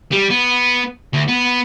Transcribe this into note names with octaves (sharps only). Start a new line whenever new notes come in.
G3
B3
D2
B3